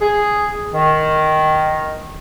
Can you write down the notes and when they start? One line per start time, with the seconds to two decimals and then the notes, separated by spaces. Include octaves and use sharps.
0.01 G#4
0.73 D#3